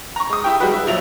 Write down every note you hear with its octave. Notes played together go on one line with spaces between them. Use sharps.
A#5 C#6
G#3 D#6
E4 G4 G5
G3 G#3 F#4 B4
E4
A#1 F3 F#3 E5 F7